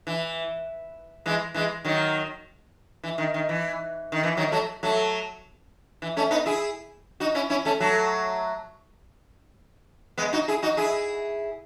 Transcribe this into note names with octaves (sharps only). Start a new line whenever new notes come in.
E3
E3 G#3
E3 G#3
D#3 F#3
E3
D#3
D#3
E3
D#3
E3
D#3 F#3
F#3 A3
F#3 A3
E3
A3 C#4
B3 D#4
E4 G#4
D#4 F#4
C#4 E4
C#4 E4
A3 C#4
F#3 A3
G#3 B3
D#4 F#4
E4 G#4
D#4 F#4
E4 G#4